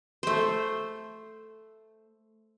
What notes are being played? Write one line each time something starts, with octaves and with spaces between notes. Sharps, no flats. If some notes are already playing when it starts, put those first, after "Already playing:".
A3 C5